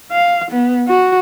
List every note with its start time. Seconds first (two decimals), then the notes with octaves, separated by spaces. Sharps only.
0.12 F5
0.51 B3
0.88 F#4